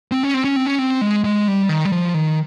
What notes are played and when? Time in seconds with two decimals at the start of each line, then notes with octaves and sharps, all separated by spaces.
0.12 C4
0.23 C#4
0.34 C4
0.44 C#4
0.56 C4
0.66 C#4
0.79 C4
1.01 G#3
1.24 G#3
1.48 G3
1.69 D#3
1.85 G3
1.92 F3
2.14 D#3